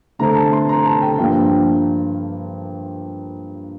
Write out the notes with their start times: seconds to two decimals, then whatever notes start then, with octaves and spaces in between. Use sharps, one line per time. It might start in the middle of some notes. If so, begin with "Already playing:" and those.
0.19 D3 A3 C4 A#5
0.36 A5
0.53 C6
0.69 A#5
0.86 A5
1.02 G5
1.19 G2 F3 A#3 D4 G5